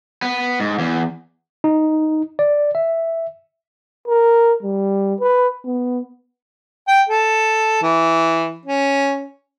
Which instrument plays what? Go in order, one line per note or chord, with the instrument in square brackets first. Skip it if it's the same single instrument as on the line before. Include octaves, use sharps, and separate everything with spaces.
[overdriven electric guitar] B3
G#2
E2
[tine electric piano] D#4
D5
E5
[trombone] A#4
G3
B4
B3
[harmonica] G5
A4
E3
C#4